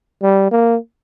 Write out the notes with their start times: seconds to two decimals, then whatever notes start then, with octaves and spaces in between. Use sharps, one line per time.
0.22 G3
0.51 A#3